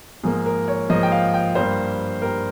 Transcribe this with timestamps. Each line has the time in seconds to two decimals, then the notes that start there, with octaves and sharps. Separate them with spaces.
0.23 G#2 F3 A#3 G#4
0.46 A#4
0.68 C#5
0.89 G#2 F3 A#3 D#5
1.03 G5
1.12 F5
1.34 G5
1.55 G2 G3 A#3 C5
2.22 G2 G3 A#3 A#4